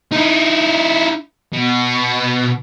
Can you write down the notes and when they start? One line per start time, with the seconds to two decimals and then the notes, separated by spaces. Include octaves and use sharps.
0.13 D#4 E4
1.53 B2